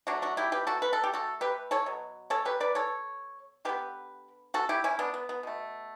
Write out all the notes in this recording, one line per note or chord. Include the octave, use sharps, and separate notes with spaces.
D3 F#3 A3 D4 F#4
D4 F#4
E4 G4
G4 B4
F#4 A4
B4
A4
G4
F#4 A4
G4 B4
A4 C#5
B2 F#3
A4 C#5
G4 B4
B4 D5
A4 C#5
D3 G3 B3 G4 B4
F#4 A4
E4 G4
C#4 E4
B3 D4
B3
B3
B2 A3